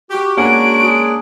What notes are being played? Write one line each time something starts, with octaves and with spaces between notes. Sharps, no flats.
F#4 G4
G#3 A#3 C#4 D4 F#5 G#5 D7
G#4